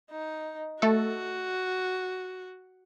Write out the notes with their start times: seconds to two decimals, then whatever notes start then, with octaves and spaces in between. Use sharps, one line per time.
0.11 D#4
0.82 A3 F#4 A4